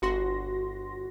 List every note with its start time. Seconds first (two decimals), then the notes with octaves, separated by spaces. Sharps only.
0.02 G1 F#4 C6 A#6